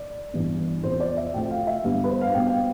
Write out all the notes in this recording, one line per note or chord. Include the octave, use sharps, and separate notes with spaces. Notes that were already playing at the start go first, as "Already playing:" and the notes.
Already playing: D5
G2 E3 G3 B3
E2 C3 F3 B3 C5
D5
E5
D2 C3 F3 A3 G5
F5
E5
G2 D3 G3 B3 F5
B4
C5
F5
B2 G3 B3 G5
F5